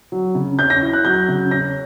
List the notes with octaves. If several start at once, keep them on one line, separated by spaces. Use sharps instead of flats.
F#3
C#3
C#4 G6
A#6
E4
F#6
F#3 G6
C#3
C#4 A#6